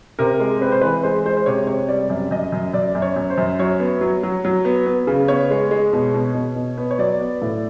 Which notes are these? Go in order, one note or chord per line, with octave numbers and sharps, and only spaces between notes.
C3 A#4
G#3
C4 B4
C5
E3 B4
G#3 C5
G#3 C5
C5
C3 C#5
C3 C#5
G3 D5
F#2
F#2 D#5
F#2
F#2 D5
F#2
C#5
F#2
C5
F#2
F#3 C#5
B3
F#3
F#3
F#3
B3
B3
C#3
B3 C#5
G#3
G#3
B2
B2
B2
B2
B3
C#5
F#3 D5
B3
A2